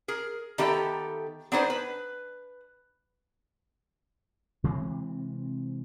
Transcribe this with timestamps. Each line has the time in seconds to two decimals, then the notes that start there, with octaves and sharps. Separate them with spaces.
0.08 G#4 A#4
0.58 D#3 B3 G4 A4 E5 A#5
1.52 B3 D4 D#4 G#4 B4 C5
1.70 B4
4.64 C3 E3 G#3 C4